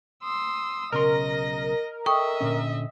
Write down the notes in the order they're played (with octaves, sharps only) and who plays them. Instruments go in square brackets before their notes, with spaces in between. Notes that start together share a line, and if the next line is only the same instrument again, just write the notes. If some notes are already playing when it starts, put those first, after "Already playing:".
[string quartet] C6 D#6 E6
[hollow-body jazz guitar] B1 C#3 C6 [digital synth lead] A#4 [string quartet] D#5 A#6
[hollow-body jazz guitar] A4 [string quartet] D#5 E5 [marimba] G5 C#6 D#6
[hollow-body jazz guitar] A#2 D3 C#4